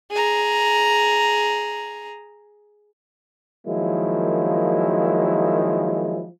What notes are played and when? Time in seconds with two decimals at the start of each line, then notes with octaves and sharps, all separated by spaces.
0.11 G#4 A#5
3.65 D#3 F3 F#3 G#3 A#3 E4